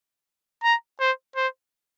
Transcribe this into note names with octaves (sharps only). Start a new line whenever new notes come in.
A#5
C5
C5